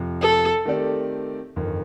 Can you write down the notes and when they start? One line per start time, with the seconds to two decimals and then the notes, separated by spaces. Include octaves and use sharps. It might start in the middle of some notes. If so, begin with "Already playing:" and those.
Already playing: F2 C3 F3
0.21 A4
0.65 D#3 A3 C4 G4 D5
1.56 G1 F2 D#3